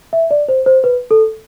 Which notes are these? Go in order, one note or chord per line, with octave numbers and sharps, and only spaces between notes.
E5
D5
C5
C5
B4
A4